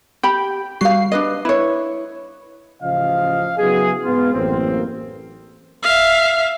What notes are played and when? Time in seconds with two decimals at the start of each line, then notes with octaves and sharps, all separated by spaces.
0.23 G4 G5 B5
0.81 G3 F#4 F5 C7
1.12 D4 B4 D#5
1.45 E4 B4 C#5
2.81 A1 C#3 F3 D#5 F5
3.58 C#3 F#3 B3 E4 F#4 G#4
4.03 G#2 B3 F4
4.33 A1 F#2 A#3 C4
5.83 E5 F5